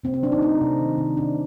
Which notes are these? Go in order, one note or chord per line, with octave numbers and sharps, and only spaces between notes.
C3 C4
C4
F#3 D4
D#4
A3 D#4
C3
D#3
C3
C3 D4